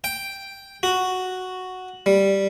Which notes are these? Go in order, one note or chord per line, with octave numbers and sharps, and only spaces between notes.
G5
F#4
G3